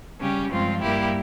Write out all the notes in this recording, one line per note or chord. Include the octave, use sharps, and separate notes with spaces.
C#3 G3 C#4 G4
G2 F3 G#3 C4 F4
G2 G3 A#3 E4 G4